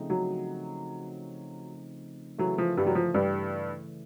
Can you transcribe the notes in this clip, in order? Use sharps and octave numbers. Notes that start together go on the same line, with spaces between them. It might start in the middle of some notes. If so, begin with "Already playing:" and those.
Already playing: C#3 F3 A3 C4 D#4
F#3
C#3 E3 F#3 A3
F3
G2 G3
F#3
F3
G2 G3